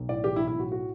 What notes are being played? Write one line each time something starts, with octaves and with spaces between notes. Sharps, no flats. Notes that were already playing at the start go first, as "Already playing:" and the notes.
Already playing: B1
A2 D5
E3 G4
E4
B1
E4
A2 F#4
F#4